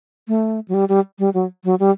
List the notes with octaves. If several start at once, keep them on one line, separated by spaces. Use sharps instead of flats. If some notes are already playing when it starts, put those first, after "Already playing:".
A3
F#3
G3
G3
G3
F#3
F#3
G3